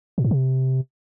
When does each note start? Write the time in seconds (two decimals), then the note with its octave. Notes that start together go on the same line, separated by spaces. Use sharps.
0.18 A#2
0.24 G#2
0.31 C3